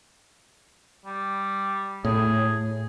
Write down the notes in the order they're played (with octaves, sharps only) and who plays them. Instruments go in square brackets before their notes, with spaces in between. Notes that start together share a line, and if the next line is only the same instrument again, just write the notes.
[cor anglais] G3
[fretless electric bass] A2 [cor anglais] G#4